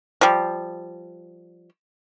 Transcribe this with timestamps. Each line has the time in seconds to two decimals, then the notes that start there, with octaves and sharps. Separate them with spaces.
0.21 F3 G3